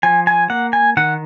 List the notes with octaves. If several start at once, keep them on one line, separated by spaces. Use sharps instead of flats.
F3 G#5
G#5
A#3 F#5
G#5
D#3 F#5